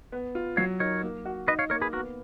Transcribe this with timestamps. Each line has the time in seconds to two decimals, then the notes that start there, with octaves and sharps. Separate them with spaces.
0.12 B3
0.35 F4
0.57 F#3 C#5 F5
0.80 D#4 A#4 C#5
1.03 A#3
1.25 F#4
1.48 D#4 B4 D#5
1.59 C#5 F5
1.70 A#3 A#4 C#5
1.81 G#4 B4
1.93 B3 F#4 A#4